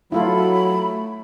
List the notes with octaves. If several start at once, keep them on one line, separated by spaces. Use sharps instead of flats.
F#3 A3 E4 F4 A4 B5